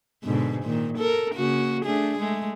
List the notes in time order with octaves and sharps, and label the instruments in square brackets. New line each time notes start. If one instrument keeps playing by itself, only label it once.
[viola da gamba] G#2 B2 D3
A#2 D#3
A4 A#4
C#3 A#3 F#4
A3 D4 G#4
G#3 A3